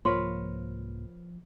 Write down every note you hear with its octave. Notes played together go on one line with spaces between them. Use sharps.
C2 G#2 F3 A#3 A#4 B4 C#5 C6